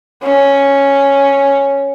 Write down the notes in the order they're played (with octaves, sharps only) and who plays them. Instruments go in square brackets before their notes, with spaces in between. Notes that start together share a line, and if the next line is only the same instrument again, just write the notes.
[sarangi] C#4